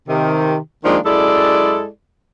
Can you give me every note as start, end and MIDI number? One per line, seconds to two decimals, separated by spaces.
0.08 0.57 48
0.08 0.57 51
0.84 0.98 51
0.84 0.98 53
0.84 0.98 56
0.84 0.98 58
0.84 0.98 62
1.04 1.87 42
1.04 1.87 56
1.04 1.87 64
1.04 1.87 69
1.04 1.87 74